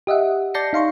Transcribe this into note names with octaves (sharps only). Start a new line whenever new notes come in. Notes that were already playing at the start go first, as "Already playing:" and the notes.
G4 D#5 E5 F#5
D5 A5 G6 A#6 C7 C#7
D#4 F5 C6 C#6